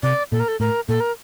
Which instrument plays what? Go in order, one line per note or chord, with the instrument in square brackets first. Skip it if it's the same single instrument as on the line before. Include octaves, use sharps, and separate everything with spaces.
[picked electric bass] C3 [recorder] D5
[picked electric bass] A#2 [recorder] A4
[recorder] A#4
A4
[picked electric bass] A2 [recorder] A#4
[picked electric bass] A#2 [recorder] A4
[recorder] A#4